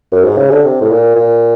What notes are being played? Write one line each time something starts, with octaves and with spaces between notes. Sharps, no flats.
F#2
G#2
C#3
D3
C3
A2
A#2
A#2